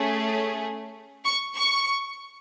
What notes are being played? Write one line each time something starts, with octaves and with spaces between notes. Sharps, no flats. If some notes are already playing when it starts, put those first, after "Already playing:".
Already playing: A3 C#4 G#4
C#6
C#6